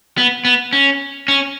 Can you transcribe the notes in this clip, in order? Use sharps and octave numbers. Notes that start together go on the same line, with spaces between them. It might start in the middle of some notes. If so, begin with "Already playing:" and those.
B3
B3
C#4
C#4